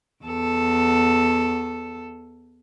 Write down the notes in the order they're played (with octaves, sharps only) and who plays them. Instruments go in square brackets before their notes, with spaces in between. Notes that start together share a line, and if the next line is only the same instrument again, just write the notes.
[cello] E2 A4